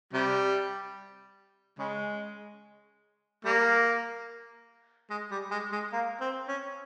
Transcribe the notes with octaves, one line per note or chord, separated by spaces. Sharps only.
C3 G3
C#3 G#3
G3 A#3
G#3
G3
G#3
G#3
A#3
C4
C#4